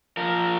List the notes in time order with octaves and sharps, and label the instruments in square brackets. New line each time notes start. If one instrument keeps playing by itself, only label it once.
[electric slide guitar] F3 A#4